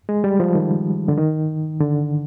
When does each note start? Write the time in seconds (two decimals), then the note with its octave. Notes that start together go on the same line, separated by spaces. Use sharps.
0.09 G#3
0.24 G3
0.40 F3
0.55 D#3
1.08 D3
1.18 D#3
1.81 D3